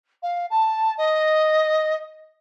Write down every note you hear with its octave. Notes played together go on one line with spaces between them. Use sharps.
F5
A5
D#5